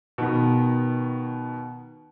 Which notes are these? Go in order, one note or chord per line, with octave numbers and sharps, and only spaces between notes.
B2 D#3 B3